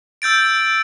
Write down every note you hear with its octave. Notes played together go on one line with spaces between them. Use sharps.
E6 G6 A6 D7